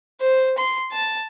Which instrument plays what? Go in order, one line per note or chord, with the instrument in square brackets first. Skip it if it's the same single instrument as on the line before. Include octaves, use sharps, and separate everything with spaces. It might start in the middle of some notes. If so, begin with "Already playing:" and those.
[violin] C5
C6
A5